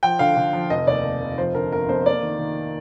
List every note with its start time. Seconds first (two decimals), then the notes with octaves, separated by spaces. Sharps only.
0.03 F3 G5
0.19 D3 F5
0.37 D3
0.53 F3
0.70 F1 D#5
0.87 D#2 D5
1.04 F1
1.21 F1
1.38 F3 C5
1.55 D3 A#4
1.72 G1 A#4
1.89 F2 C5
2.05 A#3 D5
2.22 D#3
2.39 D#3